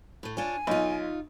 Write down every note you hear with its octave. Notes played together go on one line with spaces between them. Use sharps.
A2 A3
D4 F4 C#5 G#5
B1 D#4 F4